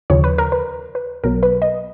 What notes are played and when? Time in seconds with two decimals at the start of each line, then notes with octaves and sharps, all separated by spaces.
0.10 D#2 C#3 F3 C#5
0.24 B4
0.38 A#4
0.52 B4
0.95 B4
1.24 B1 B2 F#3 A#4
1.43 B4
1.62 D#5